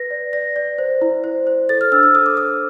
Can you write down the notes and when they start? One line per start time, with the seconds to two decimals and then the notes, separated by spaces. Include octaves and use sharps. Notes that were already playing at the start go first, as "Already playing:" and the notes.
Already playing: B4 A#6
0.11 D5
0.33 D5 A#6
0.56 D5
0.78 C5
1.02 E4
1.24 C5
1.47 C5
1.69 A4 A6
1.81 F6
1.92 D4 E6
2.03 E6
2.15 A4 D#6
2.26 D6
2.37 A4 D#6